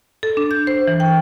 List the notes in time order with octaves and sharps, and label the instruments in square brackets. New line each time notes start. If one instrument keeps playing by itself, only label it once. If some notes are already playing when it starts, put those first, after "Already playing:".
[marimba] A4
D4
G6
C5
E3
G5